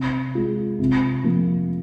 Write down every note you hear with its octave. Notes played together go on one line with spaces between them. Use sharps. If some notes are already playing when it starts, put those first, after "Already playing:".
Already playing: C3
G#3 F4
C3
F3 A#3